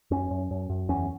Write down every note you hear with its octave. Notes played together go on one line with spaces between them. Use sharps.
F#2 C#4
F#2
F#2
F#2
E2 C#4